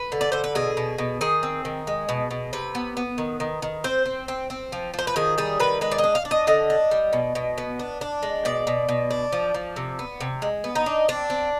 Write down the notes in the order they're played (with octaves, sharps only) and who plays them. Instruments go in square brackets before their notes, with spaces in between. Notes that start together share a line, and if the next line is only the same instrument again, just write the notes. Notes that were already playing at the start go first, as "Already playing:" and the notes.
Already playing: [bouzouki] B4
D3
D5
D3 C5
B4
B2 G#4
B2
B2
D#3 G#4
C4
D#3
G#3
B2
B2
C3 B4
B3
B3
D#3
D#3
D#3
C4 C5
C4
C4
C4
F3
F3 C5
B4
D#3 G#4
G3 G#4
D#3 B4
G#3 B4
D5
D#5
D4
F5
D4
D#5
D3 D#5
D4
G3
B2
B2
B3
D4
D4
G#3
B2 D5
B2
B2
D4
F3
F3
C3
B3
C3
G#3
B3
D#4
D4
C4 D4
C4